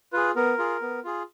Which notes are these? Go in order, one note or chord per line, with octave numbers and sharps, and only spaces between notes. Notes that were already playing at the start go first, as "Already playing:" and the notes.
F4 G#4 B4
B3 A#4
F4 G#4
B3
F4 G#4